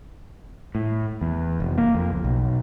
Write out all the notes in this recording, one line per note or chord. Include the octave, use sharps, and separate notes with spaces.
A2
E2
F1
A#3
F2
C#2
B1